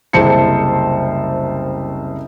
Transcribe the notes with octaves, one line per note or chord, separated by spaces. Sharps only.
F#1 C2 C5 A5 C#7